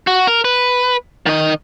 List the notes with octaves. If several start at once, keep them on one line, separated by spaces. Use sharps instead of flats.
F#4
A#4
B4
D#3 D#5